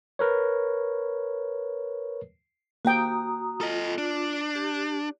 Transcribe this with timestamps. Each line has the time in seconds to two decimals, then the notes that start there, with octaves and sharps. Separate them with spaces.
0.19 A#4 B4 C#5
2.85 A#3 F#4 G5 A#5 D#6
3.61 F4 A4 D#5
3.98 D4
4.55 G4